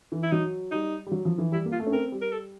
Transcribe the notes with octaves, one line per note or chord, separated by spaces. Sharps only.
E3
E4
F#3 D#4
G3 D#4
G3
F#3
F3
E3
G3 E4
A#3
F4
A3
C#4
C4 A#4
G3
A#4
A4